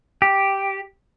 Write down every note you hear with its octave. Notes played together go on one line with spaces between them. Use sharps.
G4